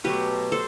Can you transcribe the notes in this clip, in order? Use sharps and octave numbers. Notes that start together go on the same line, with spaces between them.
B2 F#3 A3 G4 B4
A4 C5